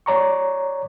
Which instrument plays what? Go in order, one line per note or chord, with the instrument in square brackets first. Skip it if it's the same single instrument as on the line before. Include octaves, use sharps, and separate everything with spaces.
[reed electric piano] C#5 D5 A#5 C#6